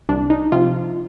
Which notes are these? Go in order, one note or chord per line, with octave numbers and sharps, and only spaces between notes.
C2 D4
D#4
C3 F3 F4